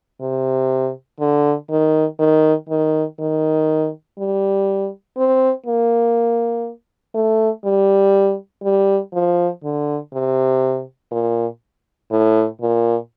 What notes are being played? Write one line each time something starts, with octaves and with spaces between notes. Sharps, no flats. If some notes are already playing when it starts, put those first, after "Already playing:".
C3
D3
D#3
D#3
D#3
D#3
G3
C4
A#3
A3
G3
G3
F3
D3
C3
A#2
A2
A#2